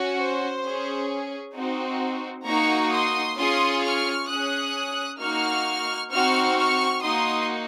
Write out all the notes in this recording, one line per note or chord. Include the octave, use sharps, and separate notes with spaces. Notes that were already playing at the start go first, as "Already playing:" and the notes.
Already playing: C#4 F#4
C5
C#4 G#4
C4 D#4 F#4
A#3 D#4 F#4 A#5 C#6
C6 D#6
C#4 F4 G#4 C6 D#6
C#6 F6
C#4 G#4 D#6 F#6
A#3 D#4 F#4 C#6 F6
C4 D#4 F#4 C#6 F6
C#6 F6
A#3 D#4 F#4 C6 D#6